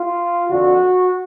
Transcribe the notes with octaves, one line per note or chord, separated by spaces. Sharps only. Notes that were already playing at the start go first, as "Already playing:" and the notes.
Already playing: F4
F2 D3 F#4